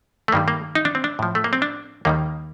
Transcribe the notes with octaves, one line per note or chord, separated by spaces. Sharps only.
A3
G2 D#3 G3 A#3
A#3
D#4
D4
C4
D4
A2 F3
A3
A#3
C4
D4
D#2 D#3 G3 A#3